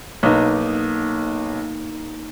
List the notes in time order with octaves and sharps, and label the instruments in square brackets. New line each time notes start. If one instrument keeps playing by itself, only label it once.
[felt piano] B1 B3 [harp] A#3 D#4